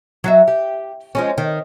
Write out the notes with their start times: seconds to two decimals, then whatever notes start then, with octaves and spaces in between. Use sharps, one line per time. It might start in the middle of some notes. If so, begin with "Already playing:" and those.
0.24 F#3 F#4 E5
0.48 G4
1.15 F3 G#3 C#4
1.38 D#3